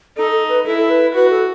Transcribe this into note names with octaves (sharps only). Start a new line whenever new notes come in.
D#4 A4
A4
B4
E4 A4
A4
B4
F#4 B4
A4